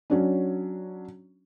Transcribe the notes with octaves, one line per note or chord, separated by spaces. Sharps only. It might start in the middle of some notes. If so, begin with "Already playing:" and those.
F#3 C#4 D4